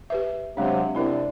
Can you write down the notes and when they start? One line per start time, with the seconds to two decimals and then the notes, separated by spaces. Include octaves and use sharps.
0.10 G4 B4 E5
0.57 C3 F#3 G#3 D4
0.95 C3 C4 D4 E4 A#4